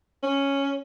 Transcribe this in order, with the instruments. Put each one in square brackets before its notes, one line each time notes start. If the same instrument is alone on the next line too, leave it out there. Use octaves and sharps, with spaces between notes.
[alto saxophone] C#4